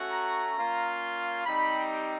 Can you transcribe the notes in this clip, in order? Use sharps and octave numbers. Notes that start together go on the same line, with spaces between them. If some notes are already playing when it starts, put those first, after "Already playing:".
Already playing: A3 C#4 F#4
A#5
A#3 C#4 F4
G3 C4 D#4 G4 B5